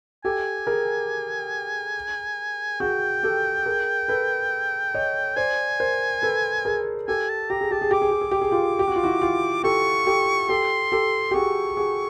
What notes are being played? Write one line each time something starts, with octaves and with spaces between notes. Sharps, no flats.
G4 A4 G#5
G#4 A#4
F#4 G#4 G5
G4 A4
G#4 A#4
A4 B4
C#5 D#5
C5 D5 G#5
A#4 C5
A4 B4
G#4 A#4
G4 A4 G#5
A5
G4 A#5
G#4
G4 A5
G#4
G4 D6
G#4
G4
G#4
G4
G#4
F4 G4
G4
F#4
F4
E4 F#4
F4 G4
G4 A4 C#6
G4 A4
G4 A4 C6
G4 A4
G4
F#4 G#4 C#6
F#4 G#4